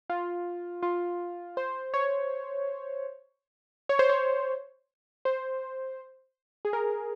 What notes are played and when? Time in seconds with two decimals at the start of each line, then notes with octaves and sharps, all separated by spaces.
0.10 F4
0.83 F4
1.57 C5
1.94 C#5
3.89 C#5
3.99 C5
4.09 C#5
5.25 C5
6.65 G#4
6.73 A#4